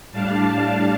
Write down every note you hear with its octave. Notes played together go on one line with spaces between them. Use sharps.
A2 G3 D4 F5 A5
F5 A5